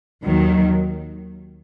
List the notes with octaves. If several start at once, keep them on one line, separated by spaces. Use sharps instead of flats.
D#2 D#3 F#3